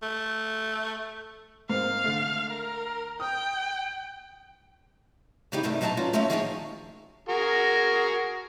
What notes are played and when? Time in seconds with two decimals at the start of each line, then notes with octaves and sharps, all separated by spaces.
0.02 A3
1.70 G#2 A#3 C4 F5
2.04 D3 A3
2.50 A#4
3.20 G5 D#6
5.52 C#3 E3 B3 D#4 G4 G#4
5.63 G2 C3 D#3 G3 A3
5.81 B2 F#3 D#4 D5 A5 A#5
5.97 B3 C#4 F4 F#4
6.13 C#3 F#3 A3 A#3 C#4 D#4
6.30 D#3 F3 D#4 F#4 G#4 C#5
7.29 F#4 G#4 A#4